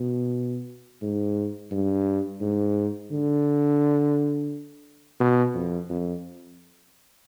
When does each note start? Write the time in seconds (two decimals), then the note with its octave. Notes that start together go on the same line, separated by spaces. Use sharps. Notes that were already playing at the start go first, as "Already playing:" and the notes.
Already playing: B2
1.02 G#2
1.72 G2
2.41 G#2
3.11 D3
5.20 B2
5.54 F2
5.89 F2